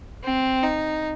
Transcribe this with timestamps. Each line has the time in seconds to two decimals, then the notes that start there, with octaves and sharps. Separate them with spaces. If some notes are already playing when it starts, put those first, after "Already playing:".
0.23 C4
0.63 D#4